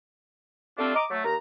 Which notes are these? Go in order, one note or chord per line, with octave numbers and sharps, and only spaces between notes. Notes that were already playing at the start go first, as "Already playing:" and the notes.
G3 A3 C4 D4 F4
D#5 A#5 D6
F#3 A3
D#2 A#5